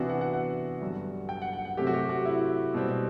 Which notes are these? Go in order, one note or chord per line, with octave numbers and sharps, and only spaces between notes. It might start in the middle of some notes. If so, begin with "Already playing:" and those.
Already playing: C3 E3 B3 D4 F#4
F#5
F#5
F#5
G2 D3 F#3
G5
F#5
F#5
F#5
C3 F#3 A3 C4 G4
F#4
G4
F#4
E4
B2 G3 C4